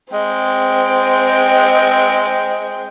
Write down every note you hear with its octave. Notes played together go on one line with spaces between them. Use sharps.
G#3 C4 G5